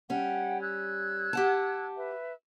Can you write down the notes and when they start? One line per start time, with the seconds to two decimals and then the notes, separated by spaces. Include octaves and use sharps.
0.10 G3 C#4 F#5 G5
0.61 E6 F#6 G#6
1.33 G4 F#5 A5
1.96 B4 E5